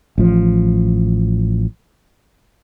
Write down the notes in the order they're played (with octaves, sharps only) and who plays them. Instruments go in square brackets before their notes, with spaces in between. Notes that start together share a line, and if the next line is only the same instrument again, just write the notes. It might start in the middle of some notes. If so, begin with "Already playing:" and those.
[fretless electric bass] A1 F3